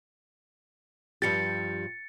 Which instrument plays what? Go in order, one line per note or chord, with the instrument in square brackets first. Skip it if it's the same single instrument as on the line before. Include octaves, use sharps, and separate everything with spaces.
[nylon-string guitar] G2 F3 G4 [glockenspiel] A6 C#7